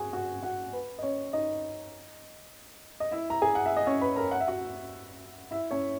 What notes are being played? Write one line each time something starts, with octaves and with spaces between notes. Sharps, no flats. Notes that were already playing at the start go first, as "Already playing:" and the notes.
Already playing: F#4 G#4 F#5 G#5
F#4 F#5
F#4 F#5
B4
D#5
C#4 C#5
D#4 D#5
D#5
E4 E5
A#5
G#4 G#5
F#5
E5
D#5
C#4 C#5
B4 B5
A#4 A#5
F#5
E5
F#4 F#5
E4 E5
C#4 C#5